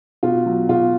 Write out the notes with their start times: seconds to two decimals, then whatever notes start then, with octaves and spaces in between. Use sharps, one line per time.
0.23 B2 F4
0.46 F#3
0.69 B2 F4